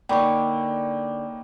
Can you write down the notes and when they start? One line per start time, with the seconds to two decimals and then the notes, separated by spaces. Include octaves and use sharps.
0.09 D3 A#3 D#4 C#5 G5 B5 C#6